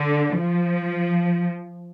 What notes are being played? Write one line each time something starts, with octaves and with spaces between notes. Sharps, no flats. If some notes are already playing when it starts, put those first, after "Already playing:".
Already playing: D3
F3